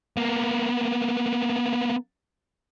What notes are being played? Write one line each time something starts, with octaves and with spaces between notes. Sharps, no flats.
A#3 B3